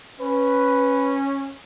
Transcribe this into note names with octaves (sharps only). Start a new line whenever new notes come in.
C#4 B4